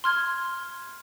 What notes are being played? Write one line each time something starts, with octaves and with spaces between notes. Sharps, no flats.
C6 F6 G#6